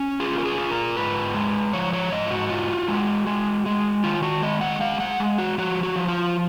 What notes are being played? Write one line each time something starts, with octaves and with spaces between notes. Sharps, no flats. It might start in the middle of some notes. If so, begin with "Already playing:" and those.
Already playing: C#4
F4 G#4
A#4
G#4
F4
A#4
G#2 B4
G#3
F3 C#5
C#5
G#2 D#5
F4
F#4
F4
G#3
G#3
G#3
D#3 F4
F#4
G#3 D#5
F#5
G#3 F5
F#5
G#3
F#4
F3 F#4
F#4
F3
F4